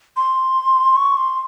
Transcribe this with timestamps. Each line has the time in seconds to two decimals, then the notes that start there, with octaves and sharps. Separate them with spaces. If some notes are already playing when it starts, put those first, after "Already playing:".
0.17 C6
0.96 C#6
1.17 C6